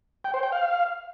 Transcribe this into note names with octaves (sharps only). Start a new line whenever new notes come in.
G5
C5
G5
F5